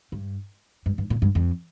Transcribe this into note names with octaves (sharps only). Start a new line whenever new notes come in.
G2
G2
G2
A#2
G2
F2